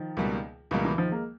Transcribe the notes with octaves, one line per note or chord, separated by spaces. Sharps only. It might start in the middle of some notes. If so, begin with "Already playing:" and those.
Already playing: D#3 F3
C#2 B2 G3 A#3
C#2 B2 E3 G3 A#3
E3
D#3 F3
G#3 A#3